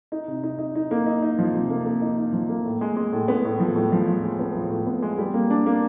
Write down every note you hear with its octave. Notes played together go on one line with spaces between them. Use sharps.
D#4
C3
D#4
D#4
D#4
A#3
D#4
D#4
F3
C3
A#3
A#3
D#4
D#4
F3
A#3
A2
G#3
G#3
A2
B3
A2
F3
A2
F3
F3
G#3
B3
F3
A2
B3
G#3
G3
A#3
D4
A#3